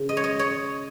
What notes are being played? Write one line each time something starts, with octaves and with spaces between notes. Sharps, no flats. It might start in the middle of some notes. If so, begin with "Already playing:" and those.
Already playing: C#3
D#5
C#5
D#5
C#5